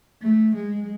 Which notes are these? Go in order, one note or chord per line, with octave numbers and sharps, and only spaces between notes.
A3
G#3